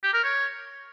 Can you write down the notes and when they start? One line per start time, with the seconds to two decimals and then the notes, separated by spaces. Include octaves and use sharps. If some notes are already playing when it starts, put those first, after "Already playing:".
0.03 G4
0.13 A#4
0.24 C#5